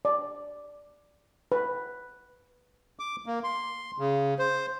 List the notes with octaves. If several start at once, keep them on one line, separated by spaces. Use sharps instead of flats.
D5
B4
D6
A#3
C6
C#3
C5